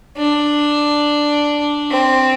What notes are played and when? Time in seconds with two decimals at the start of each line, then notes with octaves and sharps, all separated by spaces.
0.17 D4
1.91 C4